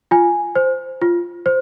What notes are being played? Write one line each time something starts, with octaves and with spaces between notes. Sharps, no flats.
F4 G#5
C5
F4
C5